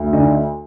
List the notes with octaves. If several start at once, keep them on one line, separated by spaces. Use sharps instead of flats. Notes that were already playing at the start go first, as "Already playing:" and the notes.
Already playing: D2
D3 D#4 D#5